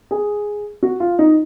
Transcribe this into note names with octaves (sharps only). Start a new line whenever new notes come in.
G#4
F#4
F4
D#4